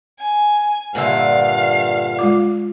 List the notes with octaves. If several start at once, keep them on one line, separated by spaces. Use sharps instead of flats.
G#5
G2 A#2 D3 E5 F5
G#3 F4 D6